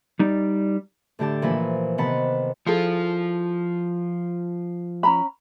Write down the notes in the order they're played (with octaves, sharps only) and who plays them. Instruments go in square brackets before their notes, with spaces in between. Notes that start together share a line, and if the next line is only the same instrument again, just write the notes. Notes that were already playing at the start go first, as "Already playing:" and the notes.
[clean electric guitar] G3 D#4 D5
[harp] A2 D3 G4 A5
A#2 E3 F3 B4 G#5
C3 D#3 B3 F#5 A5 B5
[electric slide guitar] F3 F4 [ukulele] E4 G#4 A4
[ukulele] C#4 A#5 B5